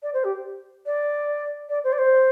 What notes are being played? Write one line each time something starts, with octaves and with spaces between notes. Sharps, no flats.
D5
C5
G4
D5
D5
C5
D5
C5